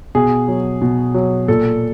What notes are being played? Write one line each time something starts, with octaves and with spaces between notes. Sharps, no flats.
B2 G#4
F#3
B2
F#3
A#2 A4